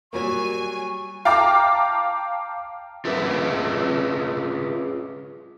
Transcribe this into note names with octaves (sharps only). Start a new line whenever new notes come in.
F#3 G3 A#3 G#5 C#6
F5 G5 A5 A#5 D6 F6
F4 G#4 B4 D#5 E5